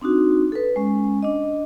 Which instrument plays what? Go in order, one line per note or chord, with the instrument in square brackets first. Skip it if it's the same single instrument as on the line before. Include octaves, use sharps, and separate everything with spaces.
[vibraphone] C4 D4 D#4 F#4
A4 B4
G#3 C#4
D4 D#5